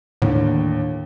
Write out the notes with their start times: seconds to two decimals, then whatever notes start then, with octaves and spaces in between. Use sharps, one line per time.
0.22 D#2 A2 D3